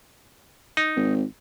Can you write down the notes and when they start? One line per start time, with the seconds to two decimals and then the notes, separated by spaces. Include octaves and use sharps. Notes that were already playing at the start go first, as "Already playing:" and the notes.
0.77 D#4
0.96 G#1